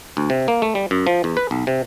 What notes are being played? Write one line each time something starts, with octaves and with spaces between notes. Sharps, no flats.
D2
C3
A#3
A3
G3
F#2
F3
E2
B4
B1
C3